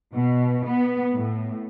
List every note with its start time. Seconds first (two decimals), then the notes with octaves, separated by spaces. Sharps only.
0.11 B2
0.65 B3
1.15 A2